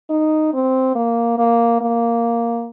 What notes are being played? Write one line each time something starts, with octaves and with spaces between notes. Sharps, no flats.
D#4
C4
A#3
A#3
A#3